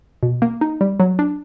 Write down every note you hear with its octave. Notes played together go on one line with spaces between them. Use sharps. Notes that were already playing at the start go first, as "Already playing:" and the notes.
B2
A#3
D#4
G3
F#3
D4